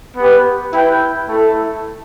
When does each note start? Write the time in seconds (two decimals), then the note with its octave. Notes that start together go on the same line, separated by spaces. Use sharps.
0.16 B3 G4 B4
0.72 E4 B4 G5
1.28 A3 E4 A4